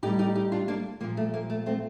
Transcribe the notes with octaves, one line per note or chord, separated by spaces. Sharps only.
A2 G3 D#4 G4
D#4 G4
D#4 G4
D4 F4
A#3 D4
A#2 F3 A#3
A3
A#3
A3
A3 C4